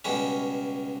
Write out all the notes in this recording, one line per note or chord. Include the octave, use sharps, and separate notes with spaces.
C#2 B2 G3 C#4